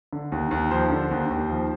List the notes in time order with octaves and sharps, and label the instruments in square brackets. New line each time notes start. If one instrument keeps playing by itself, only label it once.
[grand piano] D3
D#2
D#2
F3 C5
D3
D#2
D#2
F3